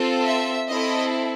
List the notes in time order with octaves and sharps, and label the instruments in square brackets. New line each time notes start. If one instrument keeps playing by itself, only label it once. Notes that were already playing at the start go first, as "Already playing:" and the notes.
Already playing: [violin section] C4 F4 A4
E5
C4 E4 A4 D#5